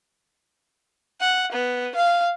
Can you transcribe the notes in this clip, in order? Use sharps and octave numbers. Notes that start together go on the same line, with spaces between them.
F#5
B3
F5